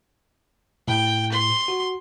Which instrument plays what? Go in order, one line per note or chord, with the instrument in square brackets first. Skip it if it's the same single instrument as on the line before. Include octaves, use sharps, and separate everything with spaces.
[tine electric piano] A2 [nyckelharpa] G5
[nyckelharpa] C6
[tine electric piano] F#4